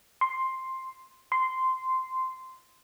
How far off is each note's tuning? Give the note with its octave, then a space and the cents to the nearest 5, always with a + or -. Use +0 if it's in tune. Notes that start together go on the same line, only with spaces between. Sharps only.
C6 +5
C6 -10